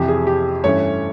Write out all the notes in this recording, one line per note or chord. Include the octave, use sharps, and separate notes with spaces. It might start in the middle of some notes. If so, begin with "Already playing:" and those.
Already playing: F2 C3 E3 G4
G#4
G4
G2 E3 A3 C#4 C#5